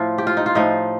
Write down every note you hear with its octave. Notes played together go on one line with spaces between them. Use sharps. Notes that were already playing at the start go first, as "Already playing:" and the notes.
Already playing: A2 F3 F4
G4
F4
D#4
F4
A2 F3 D#4